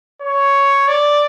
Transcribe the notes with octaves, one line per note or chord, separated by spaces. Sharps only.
C#5
D5